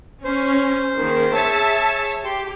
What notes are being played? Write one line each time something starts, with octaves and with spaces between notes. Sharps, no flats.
C#4 C5
D#3 A#3 G#4
G#4 C#5 E5 A5
G4 C6